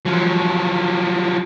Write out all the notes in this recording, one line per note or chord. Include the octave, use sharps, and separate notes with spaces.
F3 F#3